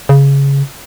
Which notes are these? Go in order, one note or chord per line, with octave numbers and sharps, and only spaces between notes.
C#3